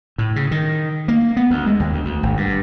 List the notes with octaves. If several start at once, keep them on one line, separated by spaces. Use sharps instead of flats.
A2
C#3
D#3
A#3
B3
D2
G#3
D#2
D2
D2
G#1
G2